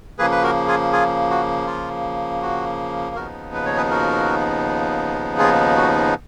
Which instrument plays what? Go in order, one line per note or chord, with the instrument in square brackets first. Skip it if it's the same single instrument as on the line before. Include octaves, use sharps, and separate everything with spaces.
[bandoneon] C#3 F3 A#3 G#4 B4
B4
F#4 A#4
F4 G#4
F4 G#4
F#4
F4
F#4
D#2 C#3 F3 B3 D#4 F#4 A#4
B4
C#5
G#4 B4
F#4 A#4
F4 G#4
F#4